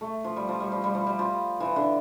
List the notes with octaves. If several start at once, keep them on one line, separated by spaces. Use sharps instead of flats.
A3
F3
G3
F3
G3
F3
G3
F3
G3
F3
E3
D3